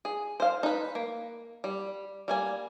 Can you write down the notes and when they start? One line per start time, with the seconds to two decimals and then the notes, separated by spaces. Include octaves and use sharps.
0.05 G#4
0.40 C5 F5
0.63 D#4 B4
0.95 A#3
1.64 G3
2.28 G3 A#3 G#5